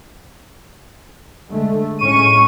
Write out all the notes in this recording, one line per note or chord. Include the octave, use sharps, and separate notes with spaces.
D3 G#3 A3
A2 G#3 C#4 C#6 D#7